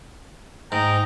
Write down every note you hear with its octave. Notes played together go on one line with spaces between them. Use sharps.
G#2 D#5 G5 A#5